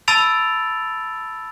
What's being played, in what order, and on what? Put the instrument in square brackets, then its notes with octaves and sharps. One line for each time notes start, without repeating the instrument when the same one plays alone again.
[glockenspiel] A5 B5 E6 A6 D7 F7